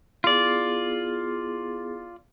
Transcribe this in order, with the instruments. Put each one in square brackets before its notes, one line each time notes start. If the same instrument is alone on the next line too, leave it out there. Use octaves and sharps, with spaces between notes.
[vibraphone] B3 E4 G#4 [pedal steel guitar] F4 D5